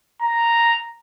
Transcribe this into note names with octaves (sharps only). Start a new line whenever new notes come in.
A#5